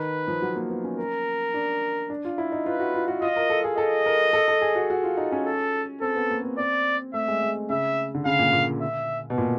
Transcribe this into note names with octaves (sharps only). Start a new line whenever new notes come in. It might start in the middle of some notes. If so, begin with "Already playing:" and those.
Already playing: D#3 B4
F3
F#3
A#3
B3
C#4
A#4
D4
D4
F4
E4
D#4
F4 B4
F#4
F4
F#4
F4 D#5
A#4
A4
G#4
A4 D#5
A#4
A4
A4
G#4
F#4
F#4
F4
D#4
C#4
A4
C4 A4
B3
A#3
C4
C4 D5
A3 E5
G#3
G#3
C#3 E5
D3
C#3 F5
A#2
A#2
E5
B2
A#2